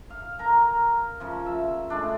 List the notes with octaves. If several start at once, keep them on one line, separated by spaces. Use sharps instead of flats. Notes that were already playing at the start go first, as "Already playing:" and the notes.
F5
A#4 A#5
C#3 F3
E5
G#3 A3 D4